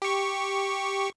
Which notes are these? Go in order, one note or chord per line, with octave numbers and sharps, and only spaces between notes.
G4 C#6